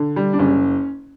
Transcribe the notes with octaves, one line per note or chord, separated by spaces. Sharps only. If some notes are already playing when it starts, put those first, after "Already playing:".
Already playing: D3
G3
D4
F#1 C#4